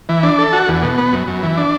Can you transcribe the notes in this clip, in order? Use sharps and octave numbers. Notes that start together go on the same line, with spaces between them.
E3
D4
A4
F#4
E2
B2
B3
F#2
F#2
E3
D4